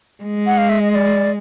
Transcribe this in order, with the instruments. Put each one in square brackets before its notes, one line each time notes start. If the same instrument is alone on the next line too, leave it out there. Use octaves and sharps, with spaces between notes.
[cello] G#3
[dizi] F#5
F5
E5
D#5
D#5
D5